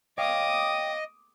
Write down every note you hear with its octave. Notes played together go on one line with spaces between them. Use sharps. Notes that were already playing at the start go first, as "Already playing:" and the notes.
C#5 D#5 F5 G5 D6 D#6